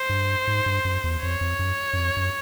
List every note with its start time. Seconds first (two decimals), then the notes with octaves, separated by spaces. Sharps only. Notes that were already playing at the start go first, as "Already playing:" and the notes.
Already playing: C5
0.09 G2
0.47 G#2
0.66 G2
0.85 F#2
1.04 E2
1.23 F2 C#5
1.41 F2
1.59 F#2
1.93 F#2
1.97 F2
2.17 F#2